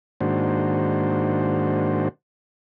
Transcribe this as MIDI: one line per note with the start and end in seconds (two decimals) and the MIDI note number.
0.21 2.08 44
0.21 2.08 51
0.21 2.08 58
0.21 2.08 62
0.21 2.08 66
0.21 2.08 72